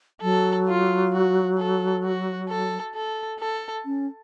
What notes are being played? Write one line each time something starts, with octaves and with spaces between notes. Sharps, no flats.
F#3 A4
F4
F#4
A4
F#4
A4
A4
A4
C#4